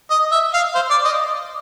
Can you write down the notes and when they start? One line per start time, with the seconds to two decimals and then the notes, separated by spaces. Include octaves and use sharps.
0.10 D#5
0.32 E5
0.54 F5
0.75 C5
0.90 D5
1.05 D#5